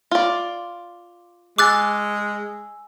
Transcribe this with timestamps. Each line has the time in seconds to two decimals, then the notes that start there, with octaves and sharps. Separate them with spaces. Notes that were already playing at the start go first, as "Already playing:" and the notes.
0.11 F4 D5
1.58 G#3 G#5 D6 E6 F#6 A6